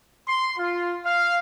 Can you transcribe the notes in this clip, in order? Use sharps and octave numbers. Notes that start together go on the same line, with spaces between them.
C6
F4
F5